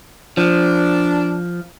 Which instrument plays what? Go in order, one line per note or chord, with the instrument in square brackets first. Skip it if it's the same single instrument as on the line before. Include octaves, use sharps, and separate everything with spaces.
[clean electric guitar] F3 [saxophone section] D4